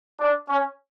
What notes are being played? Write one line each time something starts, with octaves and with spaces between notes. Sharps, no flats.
D4
C#4